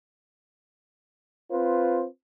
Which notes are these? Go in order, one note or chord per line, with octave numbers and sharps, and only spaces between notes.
C4 F4 B4 C5